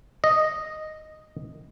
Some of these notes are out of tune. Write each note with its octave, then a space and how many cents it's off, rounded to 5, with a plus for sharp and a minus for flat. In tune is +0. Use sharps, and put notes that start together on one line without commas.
D#5 -5